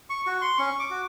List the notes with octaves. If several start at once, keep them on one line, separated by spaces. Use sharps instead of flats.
C#6
F#4 C#6
C6
C#4 C#6
D6
F#4